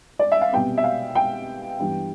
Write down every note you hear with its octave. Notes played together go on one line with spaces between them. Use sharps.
D5
E5
F5
C2 B2 G3 B3 G5
E5
F5
G5
G2 E3 G3 B3